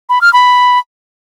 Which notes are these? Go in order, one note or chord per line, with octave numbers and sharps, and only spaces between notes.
B5
F6
B5